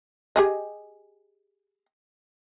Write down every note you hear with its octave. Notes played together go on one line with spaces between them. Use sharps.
G4 G#4 D#5